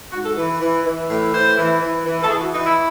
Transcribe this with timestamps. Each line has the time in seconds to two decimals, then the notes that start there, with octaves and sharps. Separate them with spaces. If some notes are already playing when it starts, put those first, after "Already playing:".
0.12 G#2 F#4
0.25 A4
0.36 E3
0.60 E3
0.85 E3
1.08 A2
1.32 E3 C5
1.57 E3
1.80 E3
2.05 E3
2.22 A4
2.29 E3 G#4
2.40 F#4
2.52 E3 D#4
2.64 E4